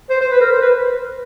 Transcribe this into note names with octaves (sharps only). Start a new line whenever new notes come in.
C5
C5
B4
A#4
C5
B4